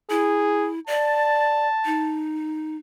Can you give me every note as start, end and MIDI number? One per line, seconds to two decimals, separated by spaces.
0.10 0.80 64
0.10 0.70 68
0.87 1.67 74
0.87 2.26 81
1.85 2.76 63